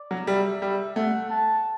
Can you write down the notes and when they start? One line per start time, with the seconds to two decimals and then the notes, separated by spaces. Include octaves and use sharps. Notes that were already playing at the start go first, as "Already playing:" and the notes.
Already playing: D5
0.11 F#3
0.27 G3 E5
0.62 G3
0.95 A3 F#5
1.30 A5